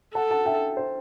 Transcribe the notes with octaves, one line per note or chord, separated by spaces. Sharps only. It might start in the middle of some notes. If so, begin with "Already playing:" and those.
A4 F#5 A5
F#5 A5
E5 G5
C5